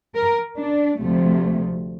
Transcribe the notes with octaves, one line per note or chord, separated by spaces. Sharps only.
A#4
D4
D2 C3 F3 A3